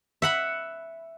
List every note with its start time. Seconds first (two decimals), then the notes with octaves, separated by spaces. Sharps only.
0.22 E5 F#5 B5